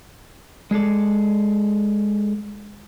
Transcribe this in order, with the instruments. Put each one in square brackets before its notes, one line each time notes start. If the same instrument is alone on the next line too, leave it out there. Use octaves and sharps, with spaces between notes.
[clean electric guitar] G#3 G#4 A4 D5